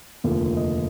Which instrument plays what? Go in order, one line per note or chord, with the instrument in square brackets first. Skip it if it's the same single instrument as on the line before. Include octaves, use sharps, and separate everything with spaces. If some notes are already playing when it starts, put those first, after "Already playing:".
[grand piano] F1 D#2 D3 F3
D#5